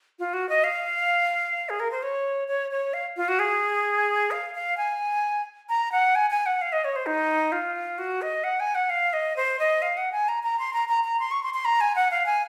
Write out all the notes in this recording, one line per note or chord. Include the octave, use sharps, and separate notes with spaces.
F4
F#4
D#5
F5
G#4
A#4
C5
C#5
C#5
C#5
F5
F4
F#4
G#4
F5
F5
G#5
A#5
F#5
G#5
G#5
F#5
F5
D#5
C#5
C5
D#4
F4
F#4
D#5
F#5
G#5
F#5
F5
D#5
C5
D#5
F5
F#5
G#5
A#5
A#5
C6
A#5
A#5
A#5
C6
C#6
C6
C6
A#5
G#5
F#5
F5
G#5